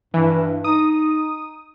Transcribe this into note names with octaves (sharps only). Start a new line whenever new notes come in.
G2 E3
D#4 D#6